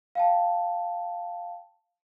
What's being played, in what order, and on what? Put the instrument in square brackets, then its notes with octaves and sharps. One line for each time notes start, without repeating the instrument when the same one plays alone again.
[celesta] F5 G5 A5